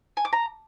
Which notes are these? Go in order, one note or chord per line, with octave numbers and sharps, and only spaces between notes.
G#5
D6
A#5